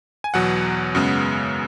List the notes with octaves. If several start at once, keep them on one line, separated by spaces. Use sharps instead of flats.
G#5
E2 B2 F#3 F#5
F#2 C#3 G#3 B3